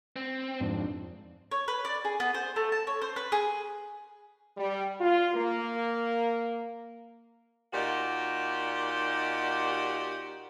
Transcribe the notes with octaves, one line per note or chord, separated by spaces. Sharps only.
C4
F2 G#2 D4
C#5
B4
D5
G#4
B3
C5
A3
A5
C#5
C5
B4
G#4
G3
F4
A#3
A#2 D#4 F#4 G4 D5